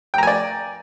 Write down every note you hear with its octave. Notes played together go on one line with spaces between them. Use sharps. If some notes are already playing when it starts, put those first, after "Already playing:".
D5 G5 G#5 A#5